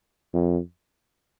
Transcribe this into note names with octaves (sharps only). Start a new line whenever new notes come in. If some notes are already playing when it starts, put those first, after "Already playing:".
F2